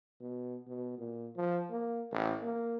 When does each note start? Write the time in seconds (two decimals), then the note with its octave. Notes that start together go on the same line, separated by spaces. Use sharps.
0.21 B2
0.67 B2
0.98 A#2
1.36 F3
1.71 A#3
2.11 A1
2.42 A#3